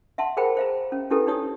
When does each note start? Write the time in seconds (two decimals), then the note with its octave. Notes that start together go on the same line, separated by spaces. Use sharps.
0.18 E5 F#5 A5 C6
0.37 G#4 A#4 C5 F#5 G5 B5
0.57 C5 F5 A#5
0.92 C#4
1.10 C#4 D4 E4 G4 A4 B4
1.27 D4 D#4 G4 C#5 D#6